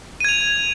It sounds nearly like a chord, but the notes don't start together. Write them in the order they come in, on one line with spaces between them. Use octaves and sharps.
D#7 G#6 F7